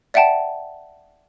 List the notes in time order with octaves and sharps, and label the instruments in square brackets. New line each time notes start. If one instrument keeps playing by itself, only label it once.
[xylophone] D5 E5 F#5 G5 A5